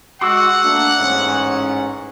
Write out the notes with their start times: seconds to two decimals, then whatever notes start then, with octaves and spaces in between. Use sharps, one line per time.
0.21 G#3 F#4 F#5 C6 D6 E6
0.64 A3 A#3 D4
0.99 A1 G#2 C#4